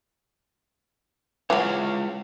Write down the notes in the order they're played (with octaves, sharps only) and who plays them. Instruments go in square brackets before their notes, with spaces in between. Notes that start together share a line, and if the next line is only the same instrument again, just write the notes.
[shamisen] E3 F#3 [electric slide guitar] G#3 F4 C#5